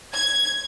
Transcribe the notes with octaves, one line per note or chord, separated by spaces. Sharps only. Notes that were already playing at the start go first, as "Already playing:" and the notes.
G#6